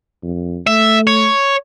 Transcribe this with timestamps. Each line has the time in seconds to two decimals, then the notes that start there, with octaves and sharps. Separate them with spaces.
0.23 F2
0.67 A3 E5
1.07 C#5